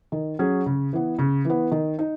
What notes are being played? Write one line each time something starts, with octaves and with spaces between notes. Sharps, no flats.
D#3
F#3 C#4 G#4
C#3
E3 B3
C#3
E3 B3
D#3
D#4